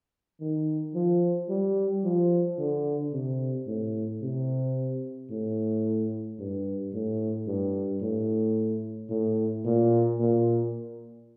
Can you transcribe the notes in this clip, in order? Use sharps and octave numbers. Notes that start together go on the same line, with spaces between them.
D#3
F3
G3
F3
D3
C3
A2
C3
A2
G2
A2
G2
A2
A2
A#2
A#2